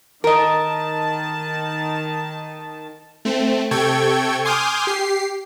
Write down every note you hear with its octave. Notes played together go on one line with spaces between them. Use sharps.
D#3 A#4 D#5 A5
A3 C4
C3 A4 G5 C#6 G#6
G#5 C6 D6 D#6 F6 G6
G4 C7